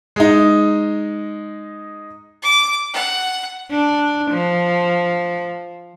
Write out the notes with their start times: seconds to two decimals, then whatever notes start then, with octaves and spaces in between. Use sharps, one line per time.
0.16 G#3 D#4
2.42 D6
2.94 F#5
3.71 D4
4.32 F3